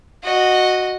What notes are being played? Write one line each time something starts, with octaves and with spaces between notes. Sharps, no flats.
F#4 D#5